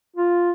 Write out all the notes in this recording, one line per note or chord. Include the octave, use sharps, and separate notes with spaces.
F4